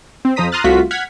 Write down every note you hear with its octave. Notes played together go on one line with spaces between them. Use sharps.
C4
F2 F3 C5 A#5 D#6 B6
A#5 C6 D#6 F6 F#6 A6
C2 A3 F4 F#4 B6
F#5 F6 G#6 B6